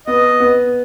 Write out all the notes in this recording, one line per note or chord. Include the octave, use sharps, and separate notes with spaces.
B3 D#5
B3